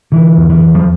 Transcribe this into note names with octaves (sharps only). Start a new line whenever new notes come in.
D3 E3
E2
E3
E2
F3